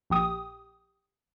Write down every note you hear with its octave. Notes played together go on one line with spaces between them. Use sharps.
A#1 G4 D#6